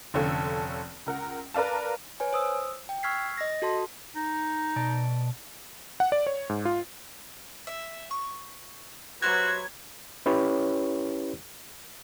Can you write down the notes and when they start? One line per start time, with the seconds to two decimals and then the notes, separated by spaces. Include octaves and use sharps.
0.14 F1 D3 C#4 A4 F5
1.06 C#2 A#4 F#5
1.54 A#4 B4 D5 F5 A5
2.20 B4 C#5 G#5
2.33 C5 D#6 E6
2.89 G5
3.03 C#6 E6 F6 G#6 B6 C7
3.38 D#5 A#6
3.62 F#4 A4 A5 C6
4.15 D#4
4.76 B2 D5 A5
6.00 F#5
6.12 D5
6.27 C#5
6.49 G#2
6.65 F4
7.67 E5
8.11 C#6
9.22 F#3 F#4 G4 B4 C5 E5 G#6
10.26 C#4 E4 G4 B4 C#5